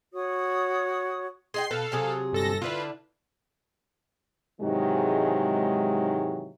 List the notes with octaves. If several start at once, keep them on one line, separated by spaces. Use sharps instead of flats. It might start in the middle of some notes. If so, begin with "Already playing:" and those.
F#4 C#5 D#6
G#4 D#5 G5 C6 C7
B2 A4 B4 F5
C3 F#3 G#4
G1 A4 A#6
D3 D4 E4 F4 B4
G#2 C3 D#3 E3 F#3 G#3